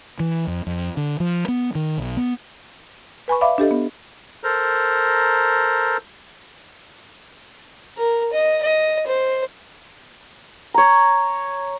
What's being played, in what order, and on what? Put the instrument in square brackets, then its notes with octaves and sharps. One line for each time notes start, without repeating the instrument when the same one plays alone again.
[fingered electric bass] E3
F2
F2
D3
F3
B3
D#3
B1
B3
[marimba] B4 G#5 B5 C#6
D5 E5 F5 B5 D6
D4 G4 A4 D#5
B3
[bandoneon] A4 A#4 C5 A#5
[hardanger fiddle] A#4
D#5
D#5
C5
[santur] C#5 A#5